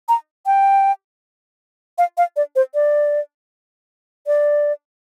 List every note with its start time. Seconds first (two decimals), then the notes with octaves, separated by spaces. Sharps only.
0.09 A#5
0.46 G5
1.98 F5
2.18 F5
2.36 D5
2.56 C5
2.74 D5
4.27 D5